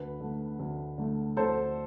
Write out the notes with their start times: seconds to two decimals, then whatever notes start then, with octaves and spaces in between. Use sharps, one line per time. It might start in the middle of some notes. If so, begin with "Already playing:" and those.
Already playing: D2 B4
0.20 D3 A3
0.59 D2
0.98 D3 A3
1.37 D2 A4 C5